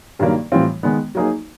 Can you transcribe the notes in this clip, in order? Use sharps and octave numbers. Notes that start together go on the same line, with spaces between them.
G2 D#3 F#3 A#3
A2 E3 G3 C4 F4
D#3 G#3 B3
F#3 A#3 D#4 G#4